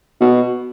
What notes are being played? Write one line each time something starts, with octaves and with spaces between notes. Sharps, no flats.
B2